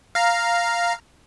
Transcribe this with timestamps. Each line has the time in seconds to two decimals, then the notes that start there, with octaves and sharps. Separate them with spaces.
0.15 F5 A#5